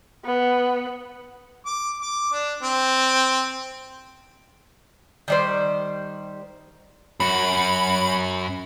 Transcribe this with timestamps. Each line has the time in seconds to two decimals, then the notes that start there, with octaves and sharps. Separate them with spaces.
0.24 B3
1.66 D6
2.02 D6
2.32 D4
2.63 C4
5.28 D#3 G3 C5
7.20 F#2 F#4 B5